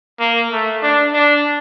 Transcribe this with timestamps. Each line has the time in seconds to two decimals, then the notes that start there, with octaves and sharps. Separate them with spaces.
0.19 A#3
0.52 A3
0.82 D4
1.13 D4